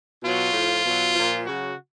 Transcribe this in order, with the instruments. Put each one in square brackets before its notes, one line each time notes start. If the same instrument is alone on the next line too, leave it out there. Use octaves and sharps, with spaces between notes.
[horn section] B2 F#3 F4
A2 F3
B2 F#3
A#2 F3
C#3 F#3 F#4